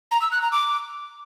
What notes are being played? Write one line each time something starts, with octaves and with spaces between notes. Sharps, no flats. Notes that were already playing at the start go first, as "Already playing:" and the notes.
A#5
E6
F#6
A#5
D6